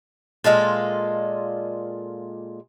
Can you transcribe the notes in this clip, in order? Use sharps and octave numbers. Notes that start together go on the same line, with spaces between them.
A#2 G#3 F4 A4